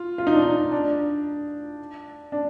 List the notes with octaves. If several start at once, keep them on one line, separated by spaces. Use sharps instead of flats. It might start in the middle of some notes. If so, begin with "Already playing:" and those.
Already playing: F4
F4
D#4
D4
D#4
D4
D4